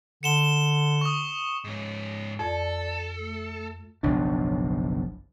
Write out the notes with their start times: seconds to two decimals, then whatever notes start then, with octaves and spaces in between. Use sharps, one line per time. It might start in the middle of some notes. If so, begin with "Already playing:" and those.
0.23 D3 C#7 E7 G7
1.01 C#6 D#6
1.64 G#2 C#4
2.39 F2 A4 D5
3.19 A3
4.03 F#1 B1 F3 D4